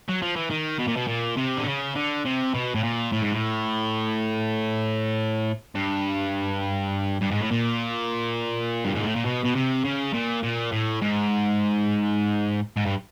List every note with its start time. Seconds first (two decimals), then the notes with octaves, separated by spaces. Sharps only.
0.09 F#3
0.22 F3
0.36 E3
0.50 D#3
0.79 B2
0.88 A#2
0.97 B2
1.08 A#2
1.37 C3
1.58 D3
1.66 C#3
1.95 D3
2.25 C3
2.54 B2
2.75 A2
2.83 A#2
3.12 A2
3.22 G#2
3.32 A2
5.75 G2
7.21 G2
7.31 G#2
7.41 A2
7.51 A#2
8.85 G2
8.95 G#2
9.05 A2
9.16 A#2
9.26 B2
9.45 B2
9.56 C3
9.85 C#3
10.14 A#2
10.43 A#2
10.72 A2
11.02 G#2
12.77 G#2
12.86 G2